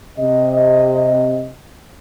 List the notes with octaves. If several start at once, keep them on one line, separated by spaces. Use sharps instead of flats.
C3 D#5